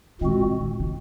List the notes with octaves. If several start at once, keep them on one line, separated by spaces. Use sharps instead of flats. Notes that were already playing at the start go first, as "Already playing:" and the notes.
A#2 D#3 G#3 C4 F#4
C#3
D#3
C#3